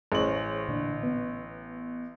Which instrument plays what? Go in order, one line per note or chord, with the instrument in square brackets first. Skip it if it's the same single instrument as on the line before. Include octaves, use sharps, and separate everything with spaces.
[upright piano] A1 F#7 [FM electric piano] G#4 C5 C#5
[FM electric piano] A#2 D3 D4
B3